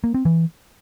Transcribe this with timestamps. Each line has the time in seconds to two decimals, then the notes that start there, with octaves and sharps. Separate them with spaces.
0.04 A#3
0.14 C4
0.25 E3